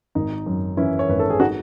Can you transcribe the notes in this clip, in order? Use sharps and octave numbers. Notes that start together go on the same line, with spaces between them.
G#1 D#4
F#2
E3 C#4 E4
C#5
G#1 B4
A4
G#4
D#4 F#4